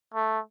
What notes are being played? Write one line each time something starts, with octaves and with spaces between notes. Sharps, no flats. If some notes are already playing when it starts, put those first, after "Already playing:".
A3